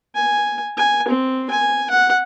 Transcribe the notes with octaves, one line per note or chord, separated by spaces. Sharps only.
G#5
G#5
C4
G#5
F#5